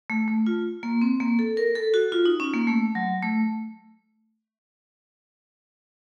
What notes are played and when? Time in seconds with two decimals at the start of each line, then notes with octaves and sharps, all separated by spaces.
0.10 A3
0.28 A3
0.47 F4
0.83 A#3
1.02 C4
1.20 A#3
1.39 A4
1.57 A#4
1.75 A4
1.94 F#4
2.12 F4
2.26 D#4
2.40 C#4
2.54 A#3
2.67 A3
2.95 F#3
3.23 A3